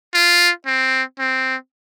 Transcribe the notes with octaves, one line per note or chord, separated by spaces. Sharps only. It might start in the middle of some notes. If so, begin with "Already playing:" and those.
F4
C4
C4